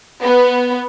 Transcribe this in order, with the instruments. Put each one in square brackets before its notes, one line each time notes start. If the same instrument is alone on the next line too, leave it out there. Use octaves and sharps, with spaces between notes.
[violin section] B3